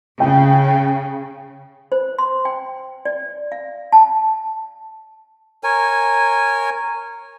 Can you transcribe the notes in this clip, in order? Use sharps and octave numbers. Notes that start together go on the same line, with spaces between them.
C#3 G5
C5
C6
G5
D5
F5
A5
A#4 C#5 G#5